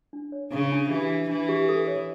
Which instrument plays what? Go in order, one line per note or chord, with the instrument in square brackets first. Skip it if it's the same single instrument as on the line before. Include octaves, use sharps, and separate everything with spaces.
[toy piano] D4
C#5
[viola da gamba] C#3 [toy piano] D4
[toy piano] D4
[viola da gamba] E3 [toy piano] G4
[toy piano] D4
[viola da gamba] E3 [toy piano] D4
[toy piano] G4
A4
C#5